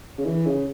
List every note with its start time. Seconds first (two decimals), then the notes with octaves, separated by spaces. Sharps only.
0.18 C#3
0.26 E3
0.46 C#3